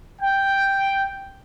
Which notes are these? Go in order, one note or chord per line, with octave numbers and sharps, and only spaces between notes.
G5